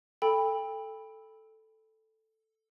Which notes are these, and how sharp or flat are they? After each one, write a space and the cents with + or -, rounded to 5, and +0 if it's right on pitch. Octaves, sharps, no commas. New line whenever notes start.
A4 +0 G5 +30 B5 +0